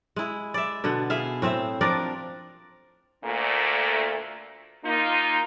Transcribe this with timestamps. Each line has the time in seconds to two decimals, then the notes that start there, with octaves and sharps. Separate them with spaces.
0.16 G#3 E4
0.54 D5 E5
0.84 B2 D3 B3
1.10 E4 G#4 E5 F5
1.42 A2 C4 C5 E5
1.81 F3 D4 A#4 D5
3.24 D2 A#2 A3
4.85 A#3 D#4 F4